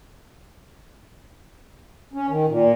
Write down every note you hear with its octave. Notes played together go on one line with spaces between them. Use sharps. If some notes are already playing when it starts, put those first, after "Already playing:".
C#4
D#3
A#2